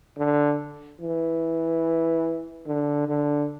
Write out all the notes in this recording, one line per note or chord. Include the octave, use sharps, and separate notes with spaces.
D3
E3
D3
D3